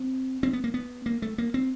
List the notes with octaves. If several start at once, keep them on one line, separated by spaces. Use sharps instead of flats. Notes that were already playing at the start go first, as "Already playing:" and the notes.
Already playing: C4
C4
B3
A#3
B3
A#3
A3
A#3
C4